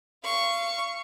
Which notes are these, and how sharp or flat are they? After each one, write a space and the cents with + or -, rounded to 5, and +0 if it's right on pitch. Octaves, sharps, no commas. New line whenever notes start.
F5 -30 C#6 +0